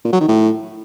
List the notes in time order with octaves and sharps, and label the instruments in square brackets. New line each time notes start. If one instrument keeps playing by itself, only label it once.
[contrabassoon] A#2
F#3
D#3
A2